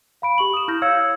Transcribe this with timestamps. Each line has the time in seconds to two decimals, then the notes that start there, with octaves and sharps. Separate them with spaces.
0.22 F5 B5 D7
0.38 G4 C#6 F#7
0.54 D#6 E7
0.68 E4 F6 G6 A#6
0.82 C#5 F5 E6 G#6 C#7